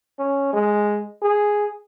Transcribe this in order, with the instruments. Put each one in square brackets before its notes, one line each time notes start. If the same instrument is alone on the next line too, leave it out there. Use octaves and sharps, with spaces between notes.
[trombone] C#4
G#3
G#4